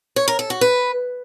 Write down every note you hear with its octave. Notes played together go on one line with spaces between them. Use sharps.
C#5
A#4
A4
F#4
B4